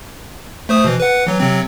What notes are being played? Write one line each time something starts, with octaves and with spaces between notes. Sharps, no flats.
A3 C5 D#6
B2 E3
B4 F#5
E3 F#3
C3 F#3 C4